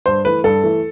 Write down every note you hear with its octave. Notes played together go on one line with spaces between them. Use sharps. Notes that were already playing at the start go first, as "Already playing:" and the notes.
G2 C5
E3 A3 B4
G2 A4
E3 A3